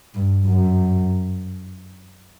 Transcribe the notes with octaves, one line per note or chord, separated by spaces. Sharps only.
G2
F#2